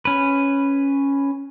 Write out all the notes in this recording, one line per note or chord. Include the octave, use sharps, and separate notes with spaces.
C#4 B4